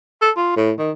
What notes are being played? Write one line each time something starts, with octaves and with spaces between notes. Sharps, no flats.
A4
F4
A2
D#3